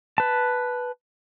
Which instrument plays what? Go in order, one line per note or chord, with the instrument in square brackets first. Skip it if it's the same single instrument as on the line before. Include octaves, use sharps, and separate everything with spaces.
[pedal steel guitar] B4 A5